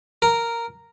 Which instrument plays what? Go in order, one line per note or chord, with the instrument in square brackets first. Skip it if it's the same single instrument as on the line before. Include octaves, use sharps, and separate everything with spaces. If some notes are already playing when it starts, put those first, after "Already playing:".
[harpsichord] A#4